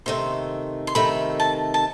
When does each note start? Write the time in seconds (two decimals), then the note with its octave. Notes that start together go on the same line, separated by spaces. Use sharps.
0.06 C3 D#3 A3 C6
0.87 C6
0.95 C3 D#3 A3 B5
1.40 A5
1.74 A5